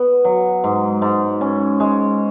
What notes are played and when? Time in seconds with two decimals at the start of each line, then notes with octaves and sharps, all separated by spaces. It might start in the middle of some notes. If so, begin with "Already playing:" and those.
Already playing: B3
0.24 F#3
0.64 G#2
1.02 G#2
1.41 C#4
1.80 G#3